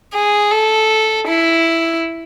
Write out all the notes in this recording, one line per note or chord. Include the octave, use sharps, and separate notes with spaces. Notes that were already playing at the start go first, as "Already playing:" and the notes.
G#4
A4
E4